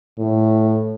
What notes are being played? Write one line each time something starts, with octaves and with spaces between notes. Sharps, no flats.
A2